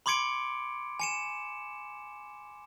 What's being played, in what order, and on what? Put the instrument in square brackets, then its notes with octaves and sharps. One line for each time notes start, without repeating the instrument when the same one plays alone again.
[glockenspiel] B5 C6 D6 G#6 C#7 D7
G#5 C#7 E7